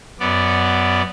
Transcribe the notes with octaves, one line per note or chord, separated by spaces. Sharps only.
F#2 B3 D5